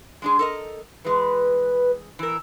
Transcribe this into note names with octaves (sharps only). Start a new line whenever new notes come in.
G#3 D4 G#4
A4 A#4 D#5
E3 G#3 B4
E3 A#4 E6